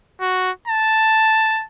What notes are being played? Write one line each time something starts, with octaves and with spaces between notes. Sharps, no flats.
F#4
A5